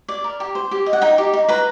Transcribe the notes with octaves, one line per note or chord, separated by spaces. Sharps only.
D5
A#4
G4
C5
G4
D#5
F#5
D#4 G5
G4
D#4
B4 A#5